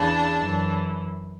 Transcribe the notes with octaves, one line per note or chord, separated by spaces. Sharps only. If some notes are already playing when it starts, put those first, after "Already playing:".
Already playing: E2 C#3 E3 D4
F#2 E3